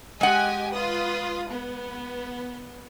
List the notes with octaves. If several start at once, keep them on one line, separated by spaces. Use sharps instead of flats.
G#3 G4 D#5 F#5 G#5
F4 B4 D#6
B3